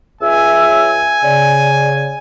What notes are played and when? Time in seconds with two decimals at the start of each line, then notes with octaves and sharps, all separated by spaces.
0.21 C#2 E5 G#5 E6
1.23 C#3 D5